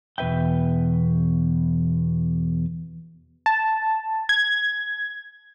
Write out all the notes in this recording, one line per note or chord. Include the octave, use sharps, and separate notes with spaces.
E2 B2 B4 E5 G5
A5
G#6